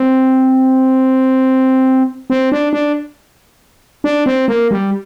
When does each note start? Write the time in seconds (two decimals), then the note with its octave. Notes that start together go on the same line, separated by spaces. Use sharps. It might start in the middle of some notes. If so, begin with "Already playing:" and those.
Already playing: C4
2.30 C4
2.52 D4
2.73 D4
4.04 D4
4.26 C4
4.48 A#3
4.71 G3